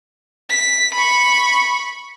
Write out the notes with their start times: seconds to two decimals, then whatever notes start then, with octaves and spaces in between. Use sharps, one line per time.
0.49 B6
0.94 B5 C#6